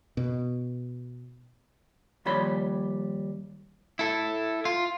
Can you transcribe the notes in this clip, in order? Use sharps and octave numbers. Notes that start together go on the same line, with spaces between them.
B2
D#2 F3 G3 C#5 B5 C6
E4 A4
F4